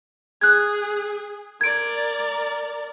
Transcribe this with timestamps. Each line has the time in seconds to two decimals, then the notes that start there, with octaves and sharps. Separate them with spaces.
0.41 G#4 F#6 G#6
1.61 A#4 D5 G#6 D7